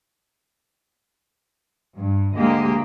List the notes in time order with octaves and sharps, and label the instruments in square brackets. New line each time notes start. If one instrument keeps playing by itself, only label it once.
[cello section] G2
D2 G#3 A#3 G4 D#5